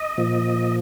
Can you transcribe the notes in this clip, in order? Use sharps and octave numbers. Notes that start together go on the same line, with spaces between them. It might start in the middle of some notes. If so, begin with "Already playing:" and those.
Already playing: D#5
A#2 F3